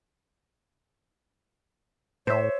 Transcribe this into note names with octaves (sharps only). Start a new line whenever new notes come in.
A2 C5 C#5 E5